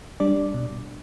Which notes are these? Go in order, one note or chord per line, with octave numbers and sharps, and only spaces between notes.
G3 D4 D5
B2